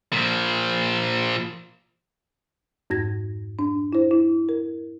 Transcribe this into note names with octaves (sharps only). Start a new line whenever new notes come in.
A#2 F3
F2 G#2 G#6 A#6
D4
E4 C5
E4
A#4